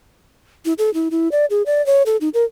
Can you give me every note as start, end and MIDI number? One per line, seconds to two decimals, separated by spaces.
0.65 0.73 64
0.78 0.93 69
0.94 1.09 64
1.11 1.28 64
1.32 1.46 74
1.50 1.63 68
1.66 1.84 74
1.86 2.02 73
2.06 2.17 69
2.21 2.29 63
2.34 2.45 70